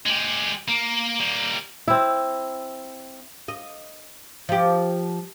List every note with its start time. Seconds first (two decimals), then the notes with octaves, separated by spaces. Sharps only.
0.06 G#3 G4
0.68 A#3
1.20 G3 A#3
1.88 C4 E4
3.48 D#5
4.49 F3 G4